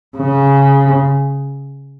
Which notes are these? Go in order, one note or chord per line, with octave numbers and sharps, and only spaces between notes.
C#3